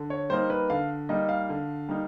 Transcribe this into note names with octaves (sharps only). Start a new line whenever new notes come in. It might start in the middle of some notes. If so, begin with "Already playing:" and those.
Already playing: D3
C#5
G3 A#3 D#4 C5
B4
D3 F5
G3 A#3 D#4 D#5
F5
D3
G3 A#3 D#4